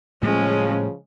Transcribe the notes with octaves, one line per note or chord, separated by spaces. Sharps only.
A2 C#3 F3 G3 G#3 C#4